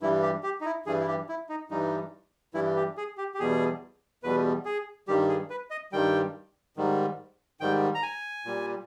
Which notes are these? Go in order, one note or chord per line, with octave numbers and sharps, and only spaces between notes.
G2 E3 G3 E4
G4
G4
D#4
E4
G2 E3 G3 G#4
E4
G4
E4
D#4
G2 E3 G3 D#4
G2 E3 G3 E4
G4
G#4
G4
G4
E2 B2 G3 G#4
E2 B2 G3 B4
G#4
G2 D#3 G3 G4
G#4
B4
D#5
G2 D#3 G3 G5
G#2 D#3 G3
G#2 D#3 G3 G5
A#5
G#5
A#2 G3